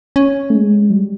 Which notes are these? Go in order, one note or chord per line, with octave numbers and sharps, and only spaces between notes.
C#4
A3
G#3
F#3
G3